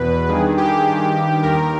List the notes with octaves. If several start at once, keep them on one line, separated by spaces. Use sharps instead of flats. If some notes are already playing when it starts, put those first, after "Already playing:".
Already playing: E2 B2 B4
G2 D#3 G#4
G4
G2 D#3
D#2 D#3 A#4